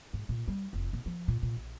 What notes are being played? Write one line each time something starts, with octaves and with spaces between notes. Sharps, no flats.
G#2
A#2
G3
F1
A#2
F3
A#2
A#2
A#1